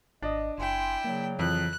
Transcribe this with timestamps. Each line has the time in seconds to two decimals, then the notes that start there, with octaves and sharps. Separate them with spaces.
0.22 G#1 D4 D#5
0.58 F#1 E4 G5 G#5 C6
1.05 C#3 F#3 A#3
1.39 F2 E3 F#6